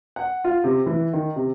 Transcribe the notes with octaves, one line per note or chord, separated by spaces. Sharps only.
F#5
F4
C3
E3
D#3
C3